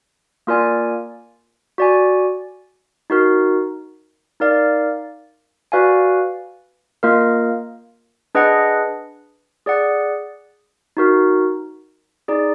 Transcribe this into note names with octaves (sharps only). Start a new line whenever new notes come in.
A#3 F4 A#4 D5 G#5
F#4 D5 G#5
D#4 F#4 A#4
D#4 A#4 D5 F5
F#4 B4 D5 F5 G#5
A#3 F4 A#4 D#5
D4 G#4 B4 D#5 F#5
G#4 D5 F#5
D#4 F#4 A#4
D#4 G#4 D5